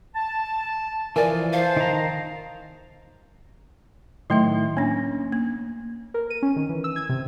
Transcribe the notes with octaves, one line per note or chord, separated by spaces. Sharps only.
A5
E3 F3 A#4 D5 G#5
C5 F5 A5
D#3 A#5
A2 D#3 F#3 A3 E5 C6
A#3 C#4 D4
A#3
A#4
D#7
C#4
D#3
E3
E6
G#6
C3